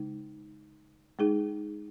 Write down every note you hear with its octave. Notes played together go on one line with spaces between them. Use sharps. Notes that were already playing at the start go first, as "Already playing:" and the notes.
Already playing: C#3 G#3 D#4
G#3 D#4 G#4